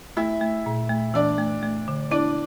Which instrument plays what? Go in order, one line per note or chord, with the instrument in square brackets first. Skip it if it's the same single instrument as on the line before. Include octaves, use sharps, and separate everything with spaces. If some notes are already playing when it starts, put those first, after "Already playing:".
[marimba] A3 [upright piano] E4 E5
[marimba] A3
A#2
A3
[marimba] E3 [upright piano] D4 D5
[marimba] A3
A3
D3
[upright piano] D4 D5 [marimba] E4